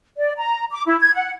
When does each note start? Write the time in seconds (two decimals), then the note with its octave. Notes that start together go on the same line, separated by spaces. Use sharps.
0.17 D5
0.38 A#5
0.71 D6
0.87 E4
1.00 G#6
1.15 F#5